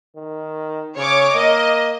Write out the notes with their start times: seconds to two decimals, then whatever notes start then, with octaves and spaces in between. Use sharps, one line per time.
0.15 D#3
0.97 C#3 C#5 D6
1.35 A#3 D#5